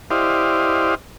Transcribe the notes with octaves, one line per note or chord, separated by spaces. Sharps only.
E4 G4 C5 D5 D#5 F5